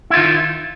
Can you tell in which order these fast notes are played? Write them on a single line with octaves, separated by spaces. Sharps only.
E4 F4 D#3